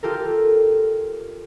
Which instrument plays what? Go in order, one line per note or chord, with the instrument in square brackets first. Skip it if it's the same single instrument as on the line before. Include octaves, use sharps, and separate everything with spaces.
[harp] F4 G4 A4 A#4